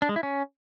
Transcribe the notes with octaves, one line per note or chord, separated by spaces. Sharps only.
D4
G#3
E4
C#4